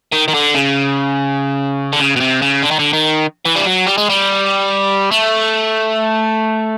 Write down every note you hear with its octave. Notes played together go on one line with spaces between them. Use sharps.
D#3
D#3
D3
C#3
D3
C#3
B2
C3
C#3
D3
D#3
D3
D#3
E3
G3
F#3
G3
G#3
G3
A3